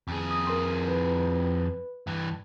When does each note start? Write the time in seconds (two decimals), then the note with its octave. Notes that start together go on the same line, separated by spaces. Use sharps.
0.08 F2 G#4
0.31 D#6
0.47 A#4 C6
0.88 B4
2.07 G2 E3